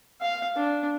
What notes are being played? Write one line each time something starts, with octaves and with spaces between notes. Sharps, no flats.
F5
D4